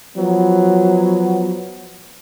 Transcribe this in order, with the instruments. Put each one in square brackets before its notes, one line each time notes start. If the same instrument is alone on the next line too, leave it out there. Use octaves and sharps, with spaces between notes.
[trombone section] F3 F#3 B3